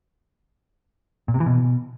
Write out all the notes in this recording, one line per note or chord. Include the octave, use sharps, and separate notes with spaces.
A#2
C3
E3
B2